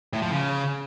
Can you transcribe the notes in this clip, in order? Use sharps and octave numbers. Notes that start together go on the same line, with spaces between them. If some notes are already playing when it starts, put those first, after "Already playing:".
A2
F3
C#3